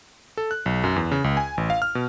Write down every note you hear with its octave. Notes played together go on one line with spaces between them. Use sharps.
A4
F#6
B1
F#2
E2
C#3
C#2
G#5
A1
F5
F6
B2